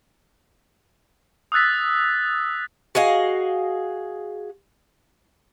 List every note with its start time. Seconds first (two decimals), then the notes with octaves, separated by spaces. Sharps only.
1.52 D#6 E6 F#6 A6 B6
2.95 F#4 G#4 D#5 F5